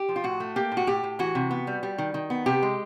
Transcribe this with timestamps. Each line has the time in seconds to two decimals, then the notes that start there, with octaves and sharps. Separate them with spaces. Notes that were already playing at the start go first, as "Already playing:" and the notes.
Already playing: G4
0.08 F3
0.16 F4
0.24 A2 F#4
0.40 A3
0.56 A#3 G4
0.72 A2
0.77 F#4
0.87 A2 G4
1.03 A2
1.19 E3 F#4
1.35 C3
1.51 B3
1.67 G3
1.83 G3
1.98 D#3
2.14 D#3
2.30 B3
2.46 C3 G4
2.62 G#3